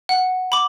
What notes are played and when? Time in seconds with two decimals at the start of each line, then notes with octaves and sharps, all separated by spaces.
0.09 F#5
0.52 B5 D6